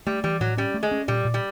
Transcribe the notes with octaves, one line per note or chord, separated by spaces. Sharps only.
G3 A3
E3 G3
A2 F#3
G3 C#4
A3
G#3
C#4
A#2 G3
A#2
G3